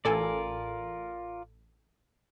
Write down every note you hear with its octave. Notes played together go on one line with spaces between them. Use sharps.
A1 F4 A4 A#4 D5 G#5